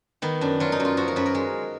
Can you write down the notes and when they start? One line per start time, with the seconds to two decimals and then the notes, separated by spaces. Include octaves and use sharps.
0.22 D#3 B3
0.41 F#2 D4
0.60 F#3 F4
0.72 D#4
0.80 F#2
0.85 F4
0.97 F3 F#4
1.08 A#4
1.16 F#2 B4
1.26 A#4
1.35 G#3